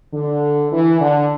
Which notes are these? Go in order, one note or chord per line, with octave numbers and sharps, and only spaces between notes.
D3
E3
D3